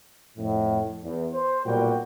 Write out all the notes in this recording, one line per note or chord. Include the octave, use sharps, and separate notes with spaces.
F2 A2
E2
C5
B1 A#2 G3 F#4 G5